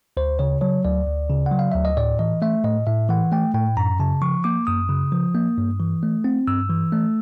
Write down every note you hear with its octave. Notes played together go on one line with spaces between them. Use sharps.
D2 C5
C#3 C#5
F#3 C#5
D2 D5
D2
C#3
F#5
F#3
F5
D2 E5
D#5
A2 D5
E3 D#5
A3 E5
A2 D#5
A2 E5
E3 F#5
A3 G5
A2 G5
F#2 A#5
C#3 A5
F3 C#6
A#3 D6
F#2 D#6
C#3
F3
A#3
G2
E3
A3
C4
G2 E6
E3
A3